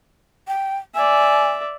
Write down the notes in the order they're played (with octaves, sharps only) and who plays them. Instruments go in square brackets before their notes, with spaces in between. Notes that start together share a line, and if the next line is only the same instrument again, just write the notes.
[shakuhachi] G5
[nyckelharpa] D5 E5 [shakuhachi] G#5